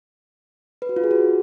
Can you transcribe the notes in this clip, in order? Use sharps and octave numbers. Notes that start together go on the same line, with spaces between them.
B4
F#4
F4
G#4
F#4